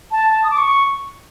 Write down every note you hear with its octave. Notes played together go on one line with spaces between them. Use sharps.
A5
A5
D#6
D6
C#6